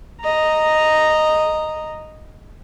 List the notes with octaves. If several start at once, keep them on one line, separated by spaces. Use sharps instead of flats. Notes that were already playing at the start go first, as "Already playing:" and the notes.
D#5 A#5